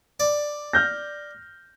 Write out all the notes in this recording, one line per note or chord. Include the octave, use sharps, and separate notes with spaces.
D5
F6 G6 A#6